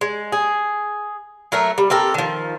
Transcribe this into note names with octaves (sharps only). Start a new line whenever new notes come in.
G#3
G#4
F#3 A3 A#4 E5
G3
C4 G4 A4 A#4
D#3 F3